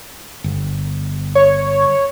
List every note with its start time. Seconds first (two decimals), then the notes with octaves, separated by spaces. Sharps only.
0.44 G1
1.35 C#5